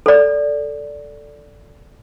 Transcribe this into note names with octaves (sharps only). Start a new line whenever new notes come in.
A4 D5